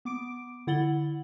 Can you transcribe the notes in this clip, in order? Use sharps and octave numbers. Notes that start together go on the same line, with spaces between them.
B3 D6 D7
D3 E4 F#5 A6 F#7 G7